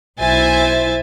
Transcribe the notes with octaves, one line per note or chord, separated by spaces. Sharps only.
B1 E4 C5 E5 G#5 A6